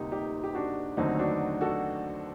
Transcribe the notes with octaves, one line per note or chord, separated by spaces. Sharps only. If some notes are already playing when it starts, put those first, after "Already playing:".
Already playing: D2 C3 G3 A#3 D#4 G4
D#4 G4
G4
D4 F#4
D#2 D3 F#3 A3 C4 D#4
D4 F#4
F#4 A4